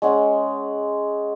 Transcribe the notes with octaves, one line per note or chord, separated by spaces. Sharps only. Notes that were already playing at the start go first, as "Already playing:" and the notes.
G#3 C#4 F#5